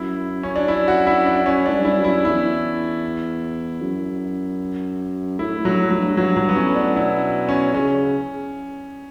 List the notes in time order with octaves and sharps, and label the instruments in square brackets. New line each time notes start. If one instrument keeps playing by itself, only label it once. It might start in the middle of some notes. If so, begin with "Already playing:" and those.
Already playing: [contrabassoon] F#2 [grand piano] E4
[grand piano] C#4
D4
E4
F#4
E4
D4
[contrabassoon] F#2 [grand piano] C#4
[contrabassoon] A2 [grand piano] D4
[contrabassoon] G2
[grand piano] E4
[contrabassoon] F#2
[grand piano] E4
[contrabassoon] E2 [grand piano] E4
[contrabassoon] F#2
[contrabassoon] A2 [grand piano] E4
[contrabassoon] A2
[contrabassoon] G2 [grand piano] F#3
[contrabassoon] A2
[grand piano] F#3
[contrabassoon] G2
[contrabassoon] G2 [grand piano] F#3
[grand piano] F#3
B3
[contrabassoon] A2 [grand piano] C#4
[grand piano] D4
[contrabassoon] B2 [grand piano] E4
[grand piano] C#4
[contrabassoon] C#3 [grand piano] C#4